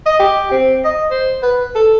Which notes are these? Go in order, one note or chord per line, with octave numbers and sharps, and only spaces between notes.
D#5
G4
C4
D#5
C5
B4
A4